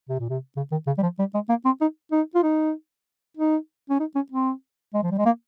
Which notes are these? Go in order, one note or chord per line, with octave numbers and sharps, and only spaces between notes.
C3
A#2
C3
C#3
D#3
C#3
G3
F3
G3
G#3
A#3
C4
D#4
D#4
F4
D#4
D#4
C#4
D#4
C#4
C4
G#3
F3
G3
G#3
A#3